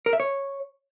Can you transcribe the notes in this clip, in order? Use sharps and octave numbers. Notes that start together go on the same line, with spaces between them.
A#4
E5
C#5